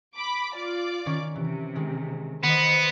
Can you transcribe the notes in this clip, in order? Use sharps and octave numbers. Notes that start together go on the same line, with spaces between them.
B5 D6
F4 D5 D6
D#3 C#4 C#5
C3 E3
D#3 G#3
D#3 B3 C5 D#5